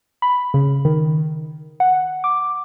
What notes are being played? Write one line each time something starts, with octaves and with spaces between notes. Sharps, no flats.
B5
C#3
D#3
F#5
D6